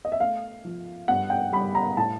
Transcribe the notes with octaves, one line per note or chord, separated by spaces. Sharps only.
D#5
E5
A3 F5
F3
G2 F#5
G5
G3 B5
A#5
A2 A5